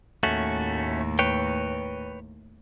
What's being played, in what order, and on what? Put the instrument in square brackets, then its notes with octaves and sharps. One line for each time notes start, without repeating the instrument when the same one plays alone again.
[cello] D#2 A2 [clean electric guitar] A3 C#4 F#4
[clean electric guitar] B4 C#5 G5